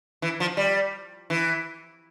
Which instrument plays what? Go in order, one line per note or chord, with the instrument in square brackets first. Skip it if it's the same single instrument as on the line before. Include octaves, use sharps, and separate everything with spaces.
[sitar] E3
F3
G3
E3